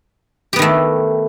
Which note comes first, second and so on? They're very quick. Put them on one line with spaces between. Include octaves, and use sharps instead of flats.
G4 B3 D#3 A3